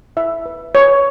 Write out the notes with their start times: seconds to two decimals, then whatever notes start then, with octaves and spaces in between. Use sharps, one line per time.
0.17 E4 E5
0.46 B4
0.75 B4 C#5